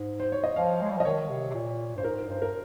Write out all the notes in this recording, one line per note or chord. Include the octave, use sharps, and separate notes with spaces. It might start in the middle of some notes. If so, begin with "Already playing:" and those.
Already playing: G#2
C5
C#5
D#5
F3 F5
G#3
G3
F3
D#5
D#3 C#5
C3
C3
A#2
G2 C5
G#2 A#4
G2 C5
A#4